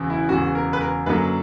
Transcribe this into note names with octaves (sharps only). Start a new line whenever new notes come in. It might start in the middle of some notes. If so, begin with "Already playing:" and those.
Already playing: E1 E2 C#3
E4
E1 E2 C#3 F#4
A#4
B4
A#4
F#2 D3 F#3 A#3 B4